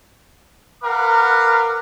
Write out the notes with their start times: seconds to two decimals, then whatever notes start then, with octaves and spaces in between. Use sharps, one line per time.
0.83 A#4 B4 F5 F#5 D6